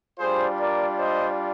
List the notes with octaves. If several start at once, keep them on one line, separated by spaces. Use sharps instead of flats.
G3 D4 F4 G#4 C5
A#4 D5
C5 D#5